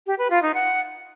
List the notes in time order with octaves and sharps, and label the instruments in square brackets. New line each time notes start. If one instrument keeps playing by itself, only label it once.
[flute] G4
B4
F4
D#4
F#5